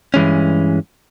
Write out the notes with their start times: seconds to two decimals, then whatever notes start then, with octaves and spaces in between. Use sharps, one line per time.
0.14 G2 E3 G#3 C#4